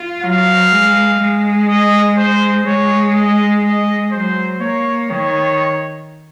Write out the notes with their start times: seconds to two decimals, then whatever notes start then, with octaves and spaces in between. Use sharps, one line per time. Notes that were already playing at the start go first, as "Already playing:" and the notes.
Already playing: F4
0.23 F#3 F5
0.72 G#3
1.21 G#3
1.68 D#5
2.18 C5
2.67 G#3 C#5
3.15 D#5
3.63 D#5
4.12 F#3 C5
4.61 A#3 C#5
5.09 D#3 C#5